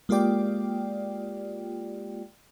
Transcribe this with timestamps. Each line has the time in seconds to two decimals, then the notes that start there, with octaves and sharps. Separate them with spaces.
0.09 G#3 A#3 F4 G4 D5 G5